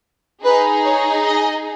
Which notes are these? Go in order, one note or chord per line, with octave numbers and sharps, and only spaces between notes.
D#4 G#4 B4
C#5
D#5